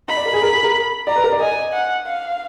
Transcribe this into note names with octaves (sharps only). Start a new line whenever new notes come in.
D#5 B5
D5
A#4
G#4
A#4
G#4
A#4
D5 A#5
B4
A#4
D5
D#5 G#5
F#5
F5